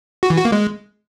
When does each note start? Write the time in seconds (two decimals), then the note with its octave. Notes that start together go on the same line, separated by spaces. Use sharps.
0.23 F#4
0.30 E3
0.38 F#4
0.45 A#3
0.52 G#3